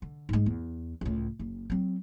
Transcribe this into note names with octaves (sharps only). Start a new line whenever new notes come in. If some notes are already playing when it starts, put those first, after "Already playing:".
D3
G#2 G#3
E2
C#2 A2
F#1
F#3 C4